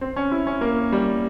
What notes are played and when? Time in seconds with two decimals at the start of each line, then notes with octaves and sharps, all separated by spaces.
0.01 C4
0.16 C#4
0.32 E4
0.47 C#4
0.61 A#3
0.92 G3